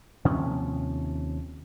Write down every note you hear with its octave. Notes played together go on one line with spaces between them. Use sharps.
D#2 C3 F3 C#4